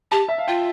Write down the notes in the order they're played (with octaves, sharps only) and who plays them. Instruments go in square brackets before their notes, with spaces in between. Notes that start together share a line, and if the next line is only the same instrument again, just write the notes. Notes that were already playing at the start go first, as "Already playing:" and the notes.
[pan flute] G4 [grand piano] A5
[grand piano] E5
F5
[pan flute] F4 [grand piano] G5